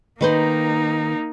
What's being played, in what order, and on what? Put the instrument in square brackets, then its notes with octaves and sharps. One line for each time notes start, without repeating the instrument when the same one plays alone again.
[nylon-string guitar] D#3 B4 C5 [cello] A#3 D#4